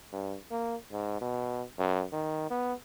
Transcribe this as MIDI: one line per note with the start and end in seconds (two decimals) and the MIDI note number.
0.13 0.36 43
0.51 0.76 58
0.92 1.17 44
1.21 1.63 47
1.78 2.03 42
2.13 2.48 51
2.50 2.73 59